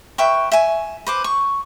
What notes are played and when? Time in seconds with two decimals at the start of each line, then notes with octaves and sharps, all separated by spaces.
0.18 B4 E5 G5 C#6
0.52 E5 G#5
1.07 B4 C5 D6
1.24 C#6